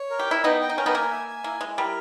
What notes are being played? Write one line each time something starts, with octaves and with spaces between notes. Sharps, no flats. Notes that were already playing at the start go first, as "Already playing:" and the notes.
Already playing: C#5
A#4
G4
E4 G5
B3 D#4 G5
G5
D#4
C#4 A#4
B3 D#4
A#3 G#5
E5
G#5
A#3 E4
G#3 E4
G3 A#4